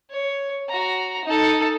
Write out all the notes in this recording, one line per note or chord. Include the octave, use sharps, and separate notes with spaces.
C#5
F#4 A#5
D#4 A4